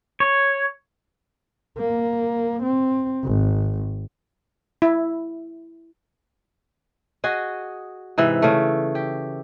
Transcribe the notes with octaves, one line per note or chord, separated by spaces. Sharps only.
C#5
A#3
C4
G#1
E4
F#4 G#4 D#5
G#2 C3 E3 E5
C#3 A3
G4